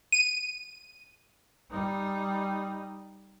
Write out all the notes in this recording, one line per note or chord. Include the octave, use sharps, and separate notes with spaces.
D#7
G3 D#4